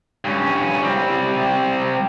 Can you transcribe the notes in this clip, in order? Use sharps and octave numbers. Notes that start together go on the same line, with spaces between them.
G2 C#4
G3 C4